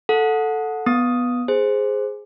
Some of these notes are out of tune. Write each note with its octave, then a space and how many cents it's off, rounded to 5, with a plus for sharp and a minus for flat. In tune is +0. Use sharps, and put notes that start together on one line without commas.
A4 +0 F#5 -20
B3 -5 D#6 +0
G#4 +0 C5 +0